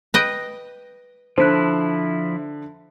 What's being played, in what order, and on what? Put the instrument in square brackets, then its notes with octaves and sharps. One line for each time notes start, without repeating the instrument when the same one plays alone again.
[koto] B4 D#5 G5
[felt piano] D3 [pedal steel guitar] F3 E4 [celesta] C5 F#6